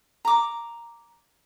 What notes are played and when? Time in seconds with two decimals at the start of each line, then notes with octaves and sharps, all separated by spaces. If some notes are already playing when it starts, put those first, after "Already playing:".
0.25 A#5 D6